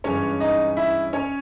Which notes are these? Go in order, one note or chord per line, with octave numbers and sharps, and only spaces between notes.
G2 E3 G#3 C#4 C#5
D#4 D#5
E4 E5
C#4 C#5